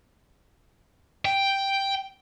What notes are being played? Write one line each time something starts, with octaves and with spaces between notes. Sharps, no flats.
G5